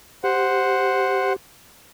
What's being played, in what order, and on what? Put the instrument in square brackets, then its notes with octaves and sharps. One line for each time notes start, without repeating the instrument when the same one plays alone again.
[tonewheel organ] G4 [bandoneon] C5 F#5